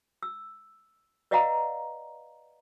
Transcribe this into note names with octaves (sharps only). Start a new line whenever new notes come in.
E6
B4 D5 D#5 F5 F#5 A#5